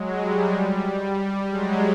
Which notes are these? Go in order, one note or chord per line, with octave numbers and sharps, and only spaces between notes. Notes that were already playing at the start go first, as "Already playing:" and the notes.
Already playing: F#3 G#3
G3
F#3 G#3